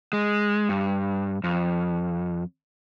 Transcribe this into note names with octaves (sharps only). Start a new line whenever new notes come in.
G#3
G2
F2